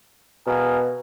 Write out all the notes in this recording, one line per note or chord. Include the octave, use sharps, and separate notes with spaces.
B2 G#4 A#4 F5